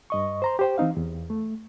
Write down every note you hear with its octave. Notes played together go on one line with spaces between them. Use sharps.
G2 D#5 C#6
C5 A#5 C6
G4 C5 G5
E3 C4 D#4 F5
E2
A3